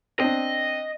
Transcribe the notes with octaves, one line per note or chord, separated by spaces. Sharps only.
C4 D4 D#5